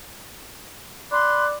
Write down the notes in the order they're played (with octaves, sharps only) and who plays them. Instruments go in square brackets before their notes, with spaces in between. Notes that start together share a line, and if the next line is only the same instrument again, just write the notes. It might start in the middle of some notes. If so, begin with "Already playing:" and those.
[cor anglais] D5 [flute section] B5 C6 F#6